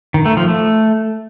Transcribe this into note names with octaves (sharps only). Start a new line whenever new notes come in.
D#3
A3
F3
A3